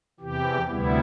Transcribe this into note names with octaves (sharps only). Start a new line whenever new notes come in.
E2 C3 E3 G4
D2 C3 G3 B3 E4